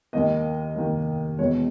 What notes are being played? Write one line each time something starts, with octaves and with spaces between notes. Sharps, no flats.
D#2 D#3 A#3 D#5
D#2 D#3 A#3
E1 E2 B2 G#3 B3 C#5